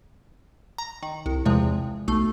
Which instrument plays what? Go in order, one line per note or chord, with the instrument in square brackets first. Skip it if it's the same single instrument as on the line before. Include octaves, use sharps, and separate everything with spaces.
[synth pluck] A#5
D#3
C2
E2 C3 F3 G#3
B1 A3